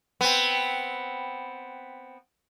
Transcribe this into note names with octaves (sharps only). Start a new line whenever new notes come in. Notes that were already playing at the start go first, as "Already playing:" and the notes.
B3 C4